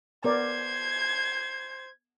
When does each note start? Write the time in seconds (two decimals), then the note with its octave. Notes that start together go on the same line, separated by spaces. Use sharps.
0.24 B3 A#4 C5 D5 G#6